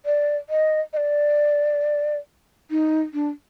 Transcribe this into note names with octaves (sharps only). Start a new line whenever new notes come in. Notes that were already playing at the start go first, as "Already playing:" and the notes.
D5
D#5
D#5
D5
D#4
D4